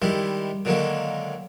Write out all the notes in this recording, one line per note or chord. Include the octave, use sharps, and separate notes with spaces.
D#3 G3 G#3 E4
D3 D#3 F#3 G#3 A#3